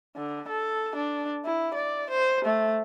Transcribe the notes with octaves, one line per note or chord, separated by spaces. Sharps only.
D3
A4
D4
E4
D5
C5
A3